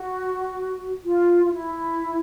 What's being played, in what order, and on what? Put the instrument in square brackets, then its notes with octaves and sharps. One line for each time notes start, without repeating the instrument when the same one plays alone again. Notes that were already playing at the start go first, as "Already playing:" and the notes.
Already playing: [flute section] F#4
F4
F4
E4